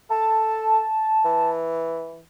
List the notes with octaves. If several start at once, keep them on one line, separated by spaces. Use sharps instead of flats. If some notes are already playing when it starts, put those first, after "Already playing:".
A4 A5
E3